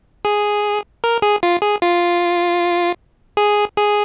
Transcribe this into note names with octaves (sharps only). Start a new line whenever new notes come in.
G#4
A#4
G#4
F4
G#4
F4
G#4
G#4